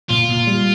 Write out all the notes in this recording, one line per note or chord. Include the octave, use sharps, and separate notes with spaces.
A#2 F4
A#2
G3